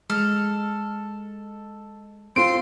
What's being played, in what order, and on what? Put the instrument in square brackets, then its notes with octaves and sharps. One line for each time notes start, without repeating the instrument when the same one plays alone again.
[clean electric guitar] G#3 [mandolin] A4 F6
[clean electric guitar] C4 [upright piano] F4 D7 [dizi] C6